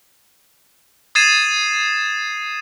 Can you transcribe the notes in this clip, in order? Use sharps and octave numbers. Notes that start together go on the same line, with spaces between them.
D#6 G#6 A6 C7 D#7 E7